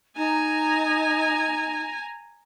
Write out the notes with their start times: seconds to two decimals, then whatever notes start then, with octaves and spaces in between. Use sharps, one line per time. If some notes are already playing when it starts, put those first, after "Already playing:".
0.16 D#4 G#5 A#5